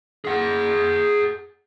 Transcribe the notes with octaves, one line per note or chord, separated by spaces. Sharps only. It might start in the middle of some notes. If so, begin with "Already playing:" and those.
G#4 F#5